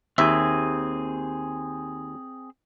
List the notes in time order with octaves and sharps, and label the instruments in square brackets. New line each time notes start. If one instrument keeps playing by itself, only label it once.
[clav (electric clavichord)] D#2 E5 [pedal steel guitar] C4 G#4